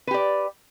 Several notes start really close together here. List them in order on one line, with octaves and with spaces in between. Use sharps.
B4 G4 D5